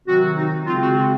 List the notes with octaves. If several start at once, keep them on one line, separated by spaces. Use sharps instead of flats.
C3 D#3 F#3 C4 F#4
D#4
C#3 G#3 C4 F4
F#4
F#4